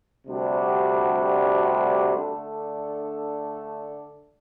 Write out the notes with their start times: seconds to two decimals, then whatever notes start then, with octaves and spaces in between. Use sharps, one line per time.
0.25 D2 C3 G3 D4 F#4
2.14 D3 A3 D4 A4